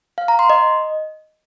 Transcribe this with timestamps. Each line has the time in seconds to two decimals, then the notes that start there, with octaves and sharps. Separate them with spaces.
0.18 F5
0.28 A#5
0.39 C6
0.50 D#5